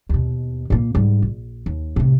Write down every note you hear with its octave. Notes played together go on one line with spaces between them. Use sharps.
D#2 B2
A#2 A#3
G#2 G3
A#1
D#2
A2 C3